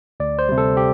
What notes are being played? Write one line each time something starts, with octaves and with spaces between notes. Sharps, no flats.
D2 D5
C5
C3 G3
A4
G4